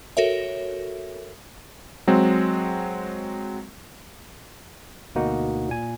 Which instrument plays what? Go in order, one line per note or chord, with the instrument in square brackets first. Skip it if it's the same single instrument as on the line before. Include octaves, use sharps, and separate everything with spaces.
[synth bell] F#4 A4 A#4 C#5 E5
[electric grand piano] F#3 G#3 C4
[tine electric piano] D2 B2 A#3 D#4 F#4 F#5
A#2 G#5